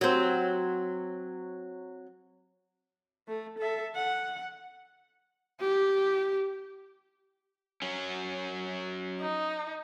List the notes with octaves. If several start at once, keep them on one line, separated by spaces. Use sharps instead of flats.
F#3 C4
A3
A4 E5
F#5
G4
F#3 C#4
D#4